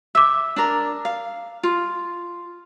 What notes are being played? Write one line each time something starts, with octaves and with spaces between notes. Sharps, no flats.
E5 D6 E6
D4 A#4
F5
F4